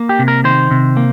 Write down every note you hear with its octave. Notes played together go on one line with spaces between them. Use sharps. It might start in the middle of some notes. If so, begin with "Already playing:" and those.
Already playing: A#3
G4
C3
A#4
D#3 C5
C3
A#3